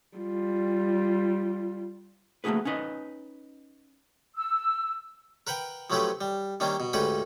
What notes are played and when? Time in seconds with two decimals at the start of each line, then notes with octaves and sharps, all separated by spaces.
0.17 G3 F4
2.44 A3 A#3 D#4 F#4 G#4 B4
2.65 C#4 D#4 B4 D#5
4.36 E6
5.47 A#4 B4 F#5 G5
5.90 F3 F#3 A3 C#4 G4 B4
6.21 G3
6.60 D#3 G3 A#3 C#4 D4
6.80 B2
6.93 D2 G#2 C#4 G4 B4 F#5